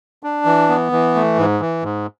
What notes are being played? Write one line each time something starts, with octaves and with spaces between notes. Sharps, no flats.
D4
E3
B3
E3
A3
G#2
E3
G#2